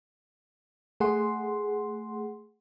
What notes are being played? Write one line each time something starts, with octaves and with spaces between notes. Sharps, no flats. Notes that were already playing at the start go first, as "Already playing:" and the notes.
A3 G#4 F#5 C6